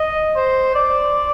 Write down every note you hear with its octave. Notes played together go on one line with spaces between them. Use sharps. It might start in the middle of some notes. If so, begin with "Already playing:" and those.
Already playing: D#5
C5
D5